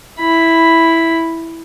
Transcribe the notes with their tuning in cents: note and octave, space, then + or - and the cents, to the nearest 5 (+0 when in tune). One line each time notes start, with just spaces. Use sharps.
E4 -5 B5 +0